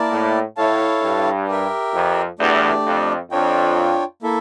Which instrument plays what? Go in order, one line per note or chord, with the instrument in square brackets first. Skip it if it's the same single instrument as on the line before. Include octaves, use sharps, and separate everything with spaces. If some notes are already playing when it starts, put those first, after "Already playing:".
Already playing: [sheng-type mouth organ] A#3 E4 A#4 D5 A5
[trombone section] A2
[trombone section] A2 [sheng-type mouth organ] E4 A4 C#5 F5 A5
[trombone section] G2
[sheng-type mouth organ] G4 A#4 E5 G5
[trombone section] F2
[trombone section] E2 [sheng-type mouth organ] A3 D4 G4 D5
[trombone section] F2
[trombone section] F2 [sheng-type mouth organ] D4 F4 C#5 G5
[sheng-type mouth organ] A#3 E4 A4 E5